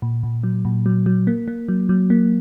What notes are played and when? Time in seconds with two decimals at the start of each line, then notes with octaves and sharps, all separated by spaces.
0.02 A#2
0.23 A#2
0.43 F#3
0.65 A#2
0.86 F#3
1.06 F#3
1.27 A#3
1.48 A#3
1.68 F#3
1.89 F#3
2.10 A#3